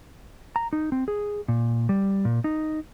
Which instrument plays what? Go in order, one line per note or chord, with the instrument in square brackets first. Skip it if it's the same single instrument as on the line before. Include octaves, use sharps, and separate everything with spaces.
[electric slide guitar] A#5
D#4
C4
G#4
A#2
G3
A#2
D#4